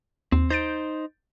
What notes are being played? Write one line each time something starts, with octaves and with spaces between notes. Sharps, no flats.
D#2 C4
D#4 C5 G6 A6 D7